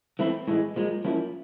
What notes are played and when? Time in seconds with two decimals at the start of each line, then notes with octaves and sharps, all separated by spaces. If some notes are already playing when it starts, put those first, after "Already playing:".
0.19 E3 A3 C4 E4
0.48 A2 E3 G#3
0.76 A#2 F3 G#3
1.05 F3 A#3 C#4 E4